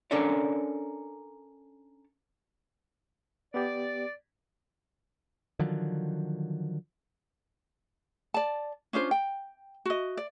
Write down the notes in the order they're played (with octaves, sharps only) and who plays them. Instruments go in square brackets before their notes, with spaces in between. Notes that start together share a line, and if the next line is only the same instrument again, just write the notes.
[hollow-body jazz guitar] C#4 D4 A4 A#4 C#5 D5
[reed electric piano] B3 G4 [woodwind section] D5
[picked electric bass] D3 D#3 F3 F#3
[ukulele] D5 A5
C#4 D4 F4 C5
G5
F#4 D#5
D5